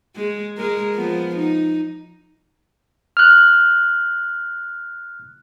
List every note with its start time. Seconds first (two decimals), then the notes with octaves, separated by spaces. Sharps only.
0.16 G#3
0.57 G#3 A#4
0.94 F3 B3
1.36 D#4
3.17 F6 F#6